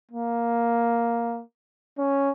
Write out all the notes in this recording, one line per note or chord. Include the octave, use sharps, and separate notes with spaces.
A#3
C#4